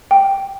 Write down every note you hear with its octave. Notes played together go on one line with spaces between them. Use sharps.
G5